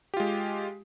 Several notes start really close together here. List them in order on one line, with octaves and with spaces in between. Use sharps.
G4 F4 G#3